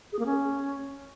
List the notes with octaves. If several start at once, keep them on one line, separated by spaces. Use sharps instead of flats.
G#4
A#3
C#4